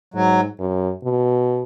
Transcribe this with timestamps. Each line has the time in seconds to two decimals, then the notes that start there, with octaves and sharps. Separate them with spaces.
0.14 G#2 F#3
0.60 F#2
1.04 B2